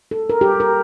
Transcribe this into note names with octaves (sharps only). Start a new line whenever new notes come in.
A4
A#4
G4
A#4